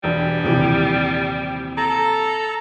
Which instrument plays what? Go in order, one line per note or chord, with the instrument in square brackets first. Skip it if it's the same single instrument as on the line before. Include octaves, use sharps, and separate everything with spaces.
[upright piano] E1 D4 [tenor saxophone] G3
[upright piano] D#1 C3 E3
[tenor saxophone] A4 [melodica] A#5